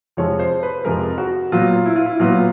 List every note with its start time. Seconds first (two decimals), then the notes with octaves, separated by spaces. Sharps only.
0.17 F2 C3 F3 G#3 C#5
0.39 C5
0.63 B4
0.85 F2 C3 F3 G#3 A#4
1.18 F#4
1.52 A#2 F#3 B3 F4
1.86 E4
1.96 F4
2.06 E4
2.20 A#2 F#3 B3 F4